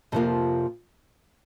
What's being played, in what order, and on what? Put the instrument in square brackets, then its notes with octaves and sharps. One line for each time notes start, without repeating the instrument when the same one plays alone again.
[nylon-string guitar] F2 C3 F3 A#3 F4